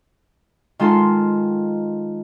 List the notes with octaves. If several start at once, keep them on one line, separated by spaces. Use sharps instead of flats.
D#3 G#3 F4 A4 C6